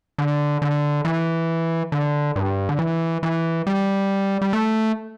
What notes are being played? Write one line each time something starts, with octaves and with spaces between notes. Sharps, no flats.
D3
D3
E3
D3
G2
D3
E3
E3
G3
G3
A3